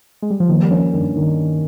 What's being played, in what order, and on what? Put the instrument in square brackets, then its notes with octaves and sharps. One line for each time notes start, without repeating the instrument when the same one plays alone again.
[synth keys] G#3
G3
F3
[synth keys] D#3 [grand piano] A#3
[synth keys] G3
[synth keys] F3 [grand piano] C#4
[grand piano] G2 [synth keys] D#3
[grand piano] D#3